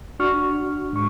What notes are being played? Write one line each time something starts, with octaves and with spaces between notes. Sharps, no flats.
D4 F#4 C#6 F6
G#2 C#6